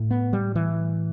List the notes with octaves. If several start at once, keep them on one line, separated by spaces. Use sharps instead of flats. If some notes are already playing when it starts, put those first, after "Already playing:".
Already playing: A2
B3
G3
E3